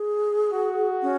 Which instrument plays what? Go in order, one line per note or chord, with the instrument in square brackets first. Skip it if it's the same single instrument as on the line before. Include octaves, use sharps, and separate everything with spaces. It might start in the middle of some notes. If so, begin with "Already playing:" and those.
Already playing: [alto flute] G#4
[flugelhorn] F#4
[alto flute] C#4